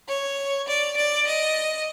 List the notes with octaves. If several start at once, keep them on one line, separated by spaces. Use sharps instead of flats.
C#5
D5
D5
D#5